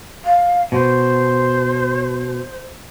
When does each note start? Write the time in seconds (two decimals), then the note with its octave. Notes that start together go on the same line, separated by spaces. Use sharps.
0.25 F5
0.72 B2 C5